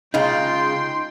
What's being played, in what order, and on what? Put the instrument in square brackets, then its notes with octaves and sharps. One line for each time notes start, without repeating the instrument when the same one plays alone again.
[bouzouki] C#3 G#3 F4 [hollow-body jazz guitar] D#4 [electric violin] G5 C6